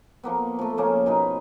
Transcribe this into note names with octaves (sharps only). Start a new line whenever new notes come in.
F3 A#3 B3
F3 A3
C#3 A#3 C#4
B2 D#4 B4